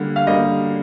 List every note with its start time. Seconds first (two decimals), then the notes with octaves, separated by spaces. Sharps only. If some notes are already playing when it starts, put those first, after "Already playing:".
Already playing: D3 G3 A#3
0.16 F5
0.27 D3 G3 A#3 D#5